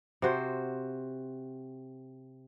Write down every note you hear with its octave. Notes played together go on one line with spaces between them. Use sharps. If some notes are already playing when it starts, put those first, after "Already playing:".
C3 F#4 C5